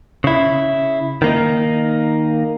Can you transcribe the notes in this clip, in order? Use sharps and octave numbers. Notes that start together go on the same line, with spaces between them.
C#3 E4
D#3 A#3 D#4